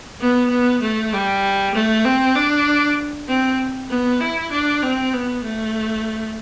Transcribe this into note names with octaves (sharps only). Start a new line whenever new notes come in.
B3
B3
A3
G3
A3
C4
D4
C4
B3
E4
D4
C4
B3
A3